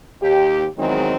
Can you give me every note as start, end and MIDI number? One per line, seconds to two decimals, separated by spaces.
0.21 0.65 39
0.21 0.65 67
0.78 1.16 40
0.78 1.16 51
0.78 1.16 54
0.78 1.16 56
0.78 1.16 60